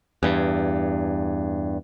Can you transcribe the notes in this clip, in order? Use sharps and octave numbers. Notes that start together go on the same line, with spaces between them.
E2 G2